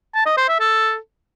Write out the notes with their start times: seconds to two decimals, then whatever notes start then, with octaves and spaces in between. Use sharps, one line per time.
0.15 A5
0.26 D#5
0.38 C5
0.49 E5
0.60 A4